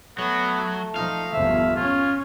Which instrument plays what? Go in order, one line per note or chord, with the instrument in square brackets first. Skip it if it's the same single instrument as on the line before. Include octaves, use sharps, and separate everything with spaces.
[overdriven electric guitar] F#3 [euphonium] A3 [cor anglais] B3
[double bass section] F3 [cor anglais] D#4 [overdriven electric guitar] F5
[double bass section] G1 E2 F3 [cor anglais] E5
[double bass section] C#4 [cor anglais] F4